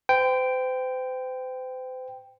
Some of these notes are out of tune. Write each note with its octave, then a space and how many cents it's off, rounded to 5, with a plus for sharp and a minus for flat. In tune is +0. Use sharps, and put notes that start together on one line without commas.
C5 -40 G5 +0